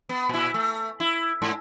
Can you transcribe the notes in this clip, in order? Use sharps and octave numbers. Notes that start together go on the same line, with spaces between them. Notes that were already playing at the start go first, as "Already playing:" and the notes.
B3
A#2 E4
A3
E4
G#2